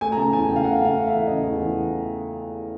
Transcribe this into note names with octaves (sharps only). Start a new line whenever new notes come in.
A3 G#5
A#5
C#3 A5
E2 G#5
C#3 G5
F5
A3 F#5
C#3 F5
A3
E5
E3
C#3 D#5
E2
E2